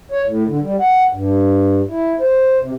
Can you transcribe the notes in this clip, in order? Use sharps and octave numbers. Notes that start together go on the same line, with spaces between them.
C#5
A2
D3
G3
F#5
G2
E4
C5
C3